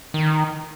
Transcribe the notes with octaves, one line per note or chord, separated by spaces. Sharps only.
D#3